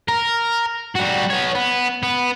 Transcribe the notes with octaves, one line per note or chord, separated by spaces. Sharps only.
A#4
G3 F#4
B3 C#5
B3
B3